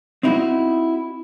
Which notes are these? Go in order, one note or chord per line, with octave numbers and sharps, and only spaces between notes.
C4 D#4 E4 F#4